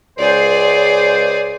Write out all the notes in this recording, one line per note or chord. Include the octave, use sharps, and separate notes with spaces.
C#2 G#4 C5 D5